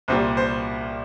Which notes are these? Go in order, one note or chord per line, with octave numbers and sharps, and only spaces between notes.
C2 A#2 G3 C5
C5